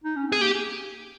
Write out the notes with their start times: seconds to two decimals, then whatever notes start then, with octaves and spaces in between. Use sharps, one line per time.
0.04 D#4
0.16 C#4
0.27 C4
0.32 G#4
0.39 A#3 G4